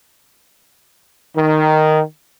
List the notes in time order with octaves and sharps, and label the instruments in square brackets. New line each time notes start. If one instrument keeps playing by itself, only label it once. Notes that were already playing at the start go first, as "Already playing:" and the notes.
[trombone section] D#3